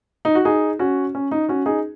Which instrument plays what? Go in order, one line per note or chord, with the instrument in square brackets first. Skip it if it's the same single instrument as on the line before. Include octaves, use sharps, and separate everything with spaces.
[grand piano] D#4
F#4
D#4 G#4
C#4 F#4
C#4
D#4
C#4 F#4
D#4 G#4